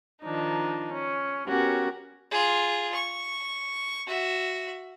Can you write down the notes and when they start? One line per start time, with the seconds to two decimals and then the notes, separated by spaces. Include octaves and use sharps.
0.23 D#3 F3 D4 D#4
0.91 C#4
1.48 B3 C#4 F#4 G4 A#4
2.31 F4 G#4
2.94 C#6
4.07 F#4 E5